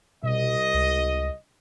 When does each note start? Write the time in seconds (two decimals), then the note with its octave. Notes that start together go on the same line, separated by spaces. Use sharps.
0.23 C2 B2 D#5
0.74 C#2